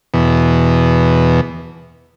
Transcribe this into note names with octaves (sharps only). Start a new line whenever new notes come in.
E2 B2